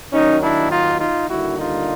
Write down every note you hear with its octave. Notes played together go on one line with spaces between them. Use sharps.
D#2 D#3 F#3 C#4 D#4
D4 E4
D#4 F4
D#4 F4
D#2 D3 G3 A#3 E4 F#4
D#4 F4